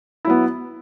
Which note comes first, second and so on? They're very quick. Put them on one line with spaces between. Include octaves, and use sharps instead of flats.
E4 F#3 B3